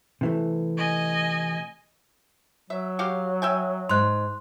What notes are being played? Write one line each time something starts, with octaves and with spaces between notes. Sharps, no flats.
C3 E3 A3
D#5 G#5
F#3 E5
F#4 G4 F5
E5 G5 G#5
G#2 C6 F#6